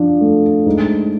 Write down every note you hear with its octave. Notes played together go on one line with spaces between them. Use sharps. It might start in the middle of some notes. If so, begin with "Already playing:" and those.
Already playing: F3 D4
A3
G#2